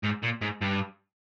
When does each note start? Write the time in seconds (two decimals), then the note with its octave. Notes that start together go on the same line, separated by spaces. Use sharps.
0.03 G#2
0.23 A#2
0.41 G#2
0.61 G2